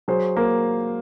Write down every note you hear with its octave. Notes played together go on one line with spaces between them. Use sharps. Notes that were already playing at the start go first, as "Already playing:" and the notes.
F#3 G#4 C5
A#3